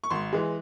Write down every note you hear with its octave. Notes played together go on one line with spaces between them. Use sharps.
C#6
G#1 C6
E3 G#3